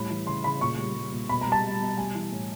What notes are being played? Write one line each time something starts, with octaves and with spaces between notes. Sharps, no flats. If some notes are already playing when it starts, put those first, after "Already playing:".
Already playing: A2 G3 B5
E3
C#3 C6
C#3 B5
A#2 C#6
G3
G3
A#2
B2 B5
A#5
G3
A5
G3
B2
G3 G#5
E3
A2